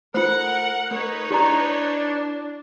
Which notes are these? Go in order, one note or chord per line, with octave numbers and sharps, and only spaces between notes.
A3 F4 A#4 C5 F#5
A3 D#4 A#4 B4 C#5
D4 E4 G4 A#5